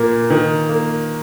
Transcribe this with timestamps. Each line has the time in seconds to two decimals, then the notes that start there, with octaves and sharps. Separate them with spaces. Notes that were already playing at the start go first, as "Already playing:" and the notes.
Already playing: A#2 A#3
0.30 D#3
0.69 A#3